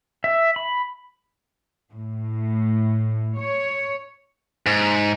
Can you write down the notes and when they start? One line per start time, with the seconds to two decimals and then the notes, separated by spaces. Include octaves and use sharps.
0.24 E5
0.56 B5
1.92 A2
3.38 C#5
4.66 G#2